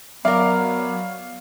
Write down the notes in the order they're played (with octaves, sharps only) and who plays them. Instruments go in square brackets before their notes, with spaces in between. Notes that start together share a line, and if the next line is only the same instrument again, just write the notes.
[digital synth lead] F#3 [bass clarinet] B3 [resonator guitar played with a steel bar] A#4 D5 [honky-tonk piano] F5